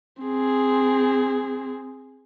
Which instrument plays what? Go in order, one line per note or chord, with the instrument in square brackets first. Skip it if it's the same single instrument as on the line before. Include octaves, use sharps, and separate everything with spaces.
[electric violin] C4 G#4